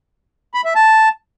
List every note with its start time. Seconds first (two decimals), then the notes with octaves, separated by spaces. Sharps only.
0.54 B5
0.65 E5
0.75 A5